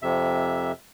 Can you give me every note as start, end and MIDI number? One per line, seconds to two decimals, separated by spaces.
0.02 0.72 41
0.02 0.72 48
0.02 0.72 76